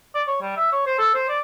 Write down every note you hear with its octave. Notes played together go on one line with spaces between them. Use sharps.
D5
C#5
G3
E5
C#5
C5
A4
C5
D5